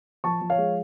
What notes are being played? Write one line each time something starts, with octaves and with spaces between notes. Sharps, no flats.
F3 A5 C#6
F3
C#5 F5
G#3